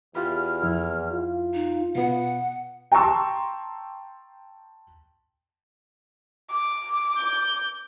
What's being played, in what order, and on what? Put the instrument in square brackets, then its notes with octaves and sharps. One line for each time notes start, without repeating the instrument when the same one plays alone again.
[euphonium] E2 [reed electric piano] F4 G4 B5 [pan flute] F6
[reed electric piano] F2 E4
[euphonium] F4
[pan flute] D#4
[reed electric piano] B2 B3 [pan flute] F#5
[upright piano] G5 A5 A#5 C6 C#6 E6
[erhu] D6
[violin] G6